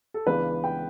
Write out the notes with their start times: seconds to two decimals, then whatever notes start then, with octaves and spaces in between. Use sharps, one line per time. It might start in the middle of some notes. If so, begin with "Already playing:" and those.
0.14 A4
0.26 C#2 C#3 E3 B3 D4 B4
0.64 G5